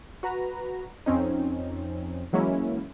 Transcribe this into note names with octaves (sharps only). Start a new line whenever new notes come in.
F#4 B4 A#5
F2 C4 C#4 D#4
E3 F#3 G#3 A#3 C#4 E4